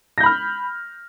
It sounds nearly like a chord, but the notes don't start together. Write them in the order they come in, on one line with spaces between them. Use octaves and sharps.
A#6 G6 B5 F6